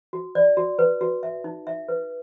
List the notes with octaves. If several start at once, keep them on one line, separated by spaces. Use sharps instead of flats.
F#4
D5
F#4
B4
F#4
E5
D#4
E5
B4